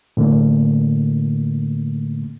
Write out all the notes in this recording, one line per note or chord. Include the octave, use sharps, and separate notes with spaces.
A2 D3 A3 A#3